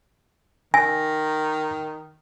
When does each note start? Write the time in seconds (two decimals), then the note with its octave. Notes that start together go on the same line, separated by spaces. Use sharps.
0.74 D#3 G#5 A#6